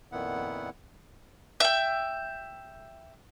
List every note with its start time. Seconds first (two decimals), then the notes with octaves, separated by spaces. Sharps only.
0.12 F2 A#2 D#3 B3 E4 F#5
1.60 E5 G5